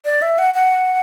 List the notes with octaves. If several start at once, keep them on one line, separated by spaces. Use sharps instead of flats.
D5
E5
F#5
F#5